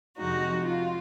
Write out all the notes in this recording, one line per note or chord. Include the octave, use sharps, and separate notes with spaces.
F2 C3 F3 G#3 D#4 F#4
F4